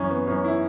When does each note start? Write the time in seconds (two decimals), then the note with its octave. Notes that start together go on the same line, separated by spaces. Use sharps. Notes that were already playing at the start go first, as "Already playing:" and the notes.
Already playing: F#2 E3 C#4
0.10 B3
0.27 F#2 C#4
0.44 E4